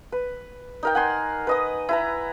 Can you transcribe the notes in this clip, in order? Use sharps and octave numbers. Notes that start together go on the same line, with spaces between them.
B4
D#4 A#4 G5
F#5 G#5 C6
B4 D#5 D#6
E4 B4 A#5